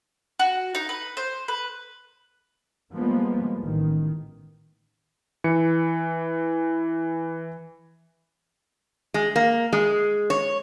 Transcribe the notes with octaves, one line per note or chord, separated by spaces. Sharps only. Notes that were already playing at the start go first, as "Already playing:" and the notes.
F#4
D#4
B4
C5
B4
F3 G3 G#3 A#3 B3
A1 D#3
E3 C#7
G#3
A#3
G#3
C#5